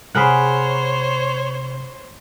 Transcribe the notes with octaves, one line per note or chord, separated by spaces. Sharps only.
C3 G#4 A#4 C5 C#5 F#5 B5 F#6